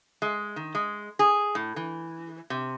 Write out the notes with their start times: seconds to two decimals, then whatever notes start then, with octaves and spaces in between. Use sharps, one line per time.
0.22 G#3
0.56 D#3
0.75 G#3
1.19 G#4
1.55 A2
1.76 E3
2.50 C3